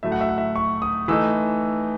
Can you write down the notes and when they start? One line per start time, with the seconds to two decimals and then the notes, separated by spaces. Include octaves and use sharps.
0.03 A2 F#3 A3 E5
0.12 F#5
0.21 E5
0.29 F#5
0.38 E5
0.56 C#6
0.82 D#6
1.08 E3 A3 D#4 E6